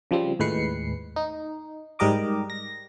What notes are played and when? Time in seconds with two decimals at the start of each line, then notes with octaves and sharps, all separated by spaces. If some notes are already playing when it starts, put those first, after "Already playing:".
0.11 C#3 F3 G3 C4
0.39 D#2 A2 G#3 B4 C7 C#7
1.16 D#4
1.99 G#2 G3 G4 A#4 D#5 D6
2.50 A#6